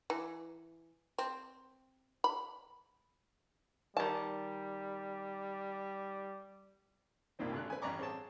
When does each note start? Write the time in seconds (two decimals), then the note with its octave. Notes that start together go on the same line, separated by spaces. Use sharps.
0.10 E3
1.19 C4
2.24 B5
3.97 D#3 G3 A5
7.39 C2 G2 A#2 D#3 C4
7.52 G#1 D3 F#6
7.70 B4 G#5
7.82 A1 G2 D5 A#5 C#6 D6
7.99 C4 G#4 C#5 A5